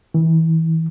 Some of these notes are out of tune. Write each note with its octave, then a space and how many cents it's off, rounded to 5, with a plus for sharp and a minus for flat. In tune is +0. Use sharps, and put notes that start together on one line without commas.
E3 -30